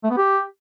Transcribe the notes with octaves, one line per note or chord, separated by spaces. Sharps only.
A3
B3
G4